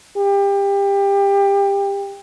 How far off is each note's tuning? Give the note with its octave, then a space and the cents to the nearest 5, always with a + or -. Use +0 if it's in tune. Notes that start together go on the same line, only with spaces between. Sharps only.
G4 +25